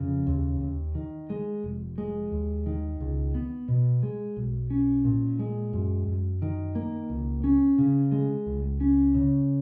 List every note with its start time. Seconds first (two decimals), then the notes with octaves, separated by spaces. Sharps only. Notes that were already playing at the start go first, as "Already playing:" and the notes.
Already playing: F2 C#3
0.27 D#2
0.61 D#2
0.95 D#3
1.30 G#3
1.64 F1
1.98 G#3
2.32 D#2
2.66 D#3
3.01 C#2
3.35 B3
3.68 B2
4.03 G#3
4.37 B1
4.70 C#4
5.05 A#2
5.39 G#3
5.73 F#2
6.08 F#2
6.42 D#3
6.75 A#3
7.10 C#2
7.44 C#4
7.78 C#3
8.12 G#3
8.46 C#2
8.81 C#4
9.15 C#3